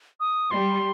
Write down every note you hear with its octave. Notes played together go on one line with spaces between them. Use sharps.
D#6
G3 C6